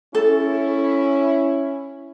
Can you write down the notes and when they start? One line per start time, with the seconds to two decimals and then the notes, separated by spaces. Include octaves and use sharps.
0.15 C#4 E4 A4